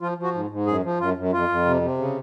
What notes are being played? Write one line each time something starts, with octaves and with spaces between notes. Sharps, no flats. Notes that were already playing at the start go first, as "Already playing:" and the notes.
F3 F4
F3
F#4
G#2
G#2
F#2 G#4
F3
F#2 F4
F#2
F2 F4
F2
C3
C3
C#3